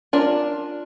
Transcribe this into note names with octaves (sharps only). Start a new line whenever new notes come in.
D4 F4 A#4 D5